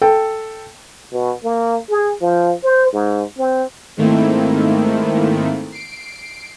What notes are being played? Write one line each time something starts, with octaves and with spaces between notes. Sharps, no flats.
A4 G5
B2
A#3
G#4
F3
C5
G#2
C4
G#2 D#3 A3 A#3 C4 E4
C7 D7